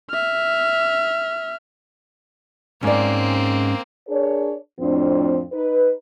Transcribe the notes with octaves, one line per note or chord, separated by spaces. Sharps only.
E5 F6
G#2 A#3 C4 C#4 D5
D4 G#4 A#4 C#5
F2 A2 F3 C4 D4
D#4 B4